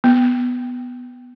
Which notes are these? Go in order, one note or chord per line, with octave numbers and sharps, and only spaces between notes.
B3